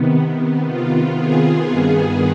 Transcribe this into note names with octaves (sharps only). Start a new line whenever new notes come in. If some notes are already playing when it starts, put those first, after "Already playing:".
Already playing: C3 D#3 B3
F4
G#4
G2 D#3 B3